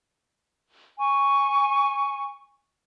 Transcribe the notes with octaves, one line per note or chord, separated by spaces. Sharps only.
G#5 C#6